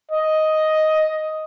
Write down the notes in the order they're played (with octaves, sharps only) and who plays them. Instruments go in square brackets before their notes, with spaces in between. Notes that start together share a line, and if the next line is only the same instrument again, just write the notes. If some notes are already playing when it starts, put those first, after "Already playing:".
[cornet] D#5